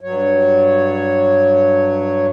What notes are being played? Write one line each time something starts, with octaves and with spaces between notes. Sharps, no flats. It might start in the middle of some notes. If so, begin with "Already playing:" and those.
G2 F#3 C#5